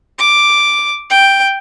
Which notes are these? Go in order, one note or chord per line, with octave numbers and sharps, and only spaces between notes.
D6
G5